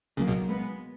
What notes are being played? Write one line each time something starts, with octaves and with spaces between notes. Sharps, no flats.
C#2 C#3 F#3 A#3
B1 B2
G#3 B3